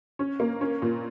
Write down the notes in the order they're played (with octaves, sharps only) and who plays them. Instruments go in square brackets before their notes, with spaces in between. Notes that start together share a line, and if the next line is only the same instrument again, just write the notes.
[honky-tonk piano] C#4
A#3
C#4
A#2